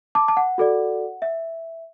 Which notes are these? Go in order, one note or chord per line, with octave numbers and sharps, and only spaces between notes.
A5 D6
A5
F#5
F#4 A4 D5
E5